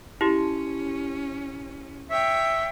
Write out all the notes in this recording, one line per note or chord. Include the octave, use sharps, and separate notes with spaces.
C#4 E4 G4
C#5 E5 G5